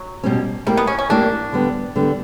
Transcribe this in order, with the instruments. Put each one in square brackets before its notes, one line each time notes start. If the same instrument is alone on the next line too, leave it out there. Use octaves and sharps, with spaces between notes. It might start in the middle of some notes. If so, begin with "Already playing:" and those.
Already playing: [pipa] F#3
[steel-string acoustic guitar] B2 G3 C#4
[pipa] G3 [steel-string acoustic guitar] A#3 E4 G4 A#4
[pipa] B3
C#4
C#4
[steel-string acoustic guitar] A#3 E4 G4 A#4 [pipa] D4
[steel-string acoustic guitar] D3 G3 B3
D3 G3 B3